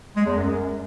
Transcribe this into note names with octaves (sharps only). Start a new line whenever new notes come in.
G#3
E2
F#2